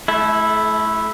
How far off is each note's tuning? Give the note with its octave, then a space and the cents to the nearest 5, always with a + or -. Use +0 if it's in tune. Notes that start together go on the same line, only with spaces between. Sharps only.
A3 -40 E4 +0